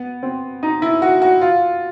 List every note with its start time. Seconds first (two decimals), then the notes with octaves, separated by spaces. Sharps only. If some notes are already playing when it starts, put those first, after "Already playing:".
Already playing: B3
0.23 C4
0.63 D#4
0.82 E4
1.02 F#4
1.22 F#4
1.41 F4